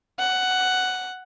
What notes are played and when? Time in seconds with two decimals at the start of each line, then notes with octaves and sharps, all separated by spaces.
0.19 F#5